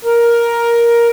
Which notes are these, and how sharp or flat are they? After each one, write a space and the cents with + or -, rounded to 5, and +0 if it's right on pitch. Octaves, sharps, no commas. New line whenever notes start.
A#4 +10